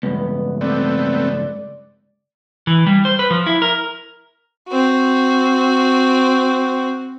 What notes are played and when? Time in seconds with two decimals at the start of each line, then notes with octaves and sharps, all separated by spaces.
0.03 C#2 G2 B3
0.61 A3 B3 C4 D5
2.67 E3
2.87 G3
3.05 C5
3.19 B4
3.31 F3
3.46 E4
3.62 A#4
4.69 C4 F#4